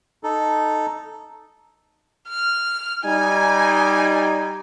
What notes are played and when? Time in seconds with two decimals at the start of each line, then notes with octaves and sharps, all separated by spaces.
0.24 D#4 A4
2.29 F6
3.04 G3 D#4 G#5